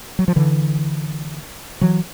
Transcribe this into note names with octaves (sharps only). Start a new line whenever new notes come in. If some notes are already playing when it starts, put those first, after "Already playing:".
F#3
F3
D3 E3
E3 F#3